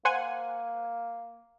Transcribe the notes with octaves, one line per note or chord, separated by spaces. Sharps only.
A#3 C5 F#5 G#5